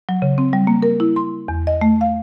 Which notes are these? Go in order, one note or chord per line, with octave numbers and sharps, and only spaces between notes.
F#3
C#3
C4
G3
A#3
A#4
E4
C6
E2
D#5
A3
F5